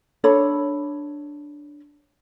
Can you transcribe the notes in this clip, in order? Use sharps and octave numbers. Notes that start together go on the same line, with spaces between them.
D4 A4 C#5 B5